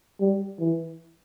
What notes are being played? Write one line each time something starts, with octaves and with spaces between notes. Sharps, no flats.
G3
E3